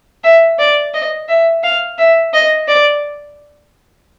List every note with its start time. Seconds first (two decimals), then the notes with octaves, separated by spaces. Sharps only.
0.24 E5
0.59 D5
0.94 D#5
1.29 E5
1.64 F5
1.98 E5
2.33 D#5
2.68 D5